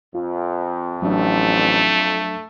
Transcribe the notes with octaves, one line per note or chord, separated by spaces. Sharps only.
F2 F4
A1 F#3 A3 D4